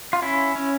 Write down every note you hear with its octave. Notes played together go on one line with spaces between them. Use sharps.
F4
C#4 E4
C#4